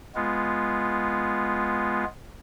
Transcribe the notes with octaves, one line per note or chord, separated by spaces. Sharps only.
G#3 B3 F4